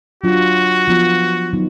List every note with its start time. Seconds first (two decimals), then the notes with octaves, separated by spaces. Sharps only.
0.23 F#3 D4 F4 F#4
0.88 F3 B3 F4
1.53 D#3 F#3 B3 D#4